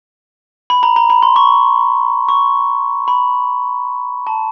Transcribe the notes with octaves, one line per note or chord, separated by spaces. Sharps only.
B5
A#5
A#5
B5
C6
C#6
C#6
B5
A5